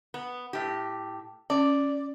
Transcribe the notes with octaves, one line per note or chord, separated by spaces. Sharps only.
B3
A2 G4
C#4 D5